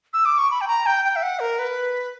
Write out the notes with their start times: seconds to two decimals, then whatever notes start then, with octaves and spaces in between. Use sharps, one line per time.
0.13 E6
0.25 D6
0.38 C#6
0.51 B5
0.61 G5
0.68 A#5
0.86 G5
1.05 G5
1.16 E5
1.23 F#5
1.40 A#4
1.59 B4